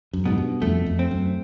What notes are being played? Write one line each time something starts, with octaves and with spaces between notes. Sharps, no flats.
F#2
G#2 B2
G2
F2 A3
F2
C4
F#2